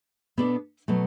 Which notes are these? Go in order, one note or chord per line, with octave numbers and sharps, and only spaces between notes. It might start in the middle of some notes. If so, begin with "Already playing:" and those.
B2 B3 D4 A4 D5
B2 F#3 A3